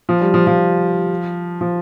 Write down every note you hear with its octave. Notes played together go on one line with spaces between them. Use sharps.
F3
G3
F3
F3
F3